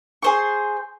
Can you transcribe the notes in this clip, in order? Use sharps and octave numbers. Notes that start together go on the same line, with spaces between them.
G#4 C5 C#6